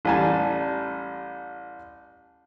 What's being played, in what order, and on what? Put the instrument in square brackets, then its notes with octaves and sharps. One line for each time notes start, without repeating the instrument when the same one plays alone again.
[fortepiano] A1 G3 G#5 A5